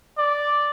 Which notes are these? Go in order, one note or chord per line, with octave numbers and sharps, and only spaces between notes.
D5